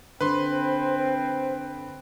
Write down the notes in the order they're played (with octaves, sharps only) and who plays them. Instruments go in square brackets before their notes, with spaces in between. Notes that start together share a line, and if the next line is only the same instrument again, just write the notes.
[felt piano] D3 [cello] C4 [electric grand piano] B4 C6 [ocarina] C5